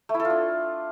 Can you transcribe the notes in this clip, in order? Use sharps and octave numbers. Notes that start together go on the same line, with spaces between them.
A3
E4
A4
F4
D4